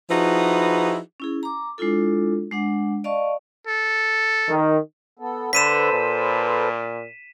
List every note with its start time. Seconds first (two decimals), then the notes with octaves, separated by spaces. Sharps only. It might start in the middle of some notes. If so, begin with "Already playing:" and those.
0.10 F3 D#4 E4 F#4 G#4 B4
1.20 C#4 E4 G#4
1.43 A#5 D6
1.78 G#3 D4 E4 F4 A4
2.51 G#3 D4 F#5
3.04 D5 D#5 F5 A5 C#6
3.67 A4
4.49 D#3
5.19 B3 A4
5.53 D3 A4 B4 C5 B6 D#7 E7
5.92 A#2